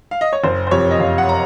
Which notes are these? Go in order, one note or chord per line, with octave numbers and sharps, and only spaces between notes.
F5
D#5
C#5
F#1 C5
C5
F2 C3 C#5
D#5
F#1 F5
F#5
A#5